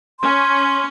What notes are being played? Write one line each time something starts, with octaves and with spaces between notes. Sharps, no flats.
C#4 C6